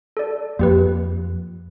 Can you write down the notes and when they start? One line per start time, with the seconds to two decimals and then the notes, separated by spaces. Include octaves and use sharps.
0.17 A4 D5
0.59 F2 A#3 G4 B4